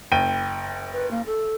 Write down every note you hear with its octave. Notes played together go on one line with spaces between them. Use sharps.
F#1 G5 D#7
B4
A#3
A4